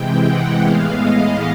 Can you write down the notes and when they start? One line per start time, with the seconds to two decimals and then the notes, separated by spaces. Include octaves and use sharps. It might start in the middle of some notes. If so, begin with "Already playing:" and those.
Already playing: C3 E3 G#3 G5
0.24 F#5
0.61 A2 E3 G#3 B3 F5
1.00 D#5